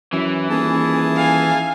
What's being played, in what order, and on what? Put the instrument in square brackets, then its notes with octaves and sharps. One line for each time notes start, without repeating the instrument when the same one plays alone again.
[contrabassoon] F#2 [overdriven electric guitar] E3
[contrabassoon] D#1 [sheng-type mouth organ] G#4 A5
[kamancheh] F5 G#5